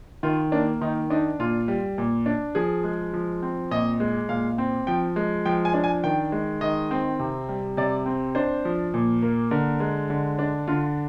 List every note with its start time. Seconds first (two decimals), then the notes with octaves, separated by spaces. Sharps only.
0.23 D#3 F4
0.52 A#3 D4
0.81 D#3 D#4
1.10 D4 D#4
1.39 A#2 F4
1.68 G3
1.98 A#2
2.26 D4
2.55 F3 G#4
2.84 G#3
3.13 F3
3.43 C4
3.71 A#2 D#5
4.00 G#3
4.29 A#2 F5
4.58 C4
4.87 F3 G5
5.16 G#3
5.46 F3 G5
5.65 G#5
5.74 D4
5.84 G#5
6.04 D#3 G5
6.32 G#3
6.61 D#3 D#5
6.91 C4
7.19 C3
7.49 G3
7.77 C3 D5
8.06 C4
8.35 D4 C5
8.65 F3
8.94 A#2
9.22 A#3
9.51 D3 A#4
9.80 G#3
10.10 D3
10.39 D4
10.68 D3 F4